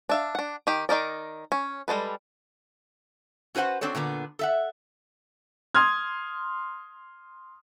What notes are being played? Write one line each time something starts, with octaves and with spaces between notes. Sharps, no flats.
D4 E5 F5
D4 F#5
D#3 G4
D#3 D#4 A#4 D5
C#4
G3 G#3 A4 B4
C#4 F#4 B4 C5 F#5
C4 D4 F#4 A4 C#5
A#2 D3 B3 D4
A4 E5 F#5
C6 D#6 F6 G#6